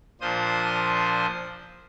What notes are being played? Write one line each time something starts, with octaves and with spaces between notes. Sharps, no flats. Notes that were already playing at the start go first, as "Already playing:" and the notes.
A#2 F3 D4 C5 D#6